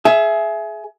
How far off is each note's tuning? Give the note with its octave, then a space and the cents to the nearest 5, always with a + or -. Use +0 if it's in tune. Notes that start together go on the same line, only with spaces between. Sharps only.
G#4 +25 E5 +10